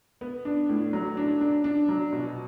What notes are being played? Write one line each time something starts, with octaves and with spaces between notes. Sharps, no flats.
B3
D4
A2
F#3
D4
D4
D4
F#3
B2